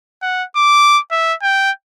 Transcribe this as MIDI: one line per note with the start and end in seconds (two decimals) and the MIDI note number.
0.22 0.44 78
0.56 0.99 86
1.11 1.34 76
1.42 1.71 79